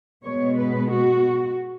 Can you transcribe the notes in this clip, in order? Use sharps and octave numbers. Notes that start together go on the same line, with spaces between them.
B2 G#3 B3 C#5
B4
F#4